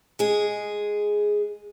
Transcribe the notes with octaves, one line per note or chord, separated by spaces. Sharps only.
G#3 G#4